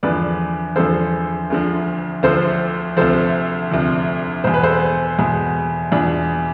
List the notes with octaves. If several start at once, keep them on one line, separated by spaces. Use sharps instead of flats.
E2 D3 F3 B4 D5
E2 D3 F3 A4 C5
D2 D3 F3
D2 D3 F3 A4 C5
D2 C3 F3 A4 C5
D2 C3 F3
E2 B2 C5
B4
A4 C5
E2 B2
E2 B2 D4 F4